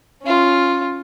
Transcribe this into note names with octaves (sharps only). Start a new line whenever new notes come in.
C#4 F4